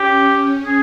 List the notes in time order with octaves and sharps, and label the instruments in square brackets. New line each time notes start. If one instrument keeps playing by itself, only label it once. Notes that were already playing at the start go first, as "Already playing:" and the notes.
Already playing: [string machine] C#4 [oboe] G4
[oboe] G#4